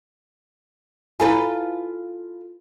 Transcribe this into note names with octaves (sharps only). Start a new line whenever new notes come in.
E4 F4 A4 B4 G#5